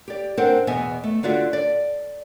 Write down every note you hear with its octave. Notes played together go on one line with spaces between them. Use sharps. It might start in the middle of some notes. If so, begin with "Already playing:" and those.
G4 D5
C4 D4 A#4 C5 F#5
E2 B2 B3 D#5 E5 G#5
A3
D3 D4 F4 F#4 D5 E5
D5